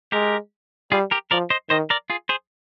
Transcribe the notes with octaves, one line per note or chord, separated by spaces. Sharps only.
G#3 G4 A#4
G3 F4 G#4
G4 A#4
F3 A#4 D5
C5 D#5
D#3 C5 D#5
A#4 D5
F4 G#4
G#4 C5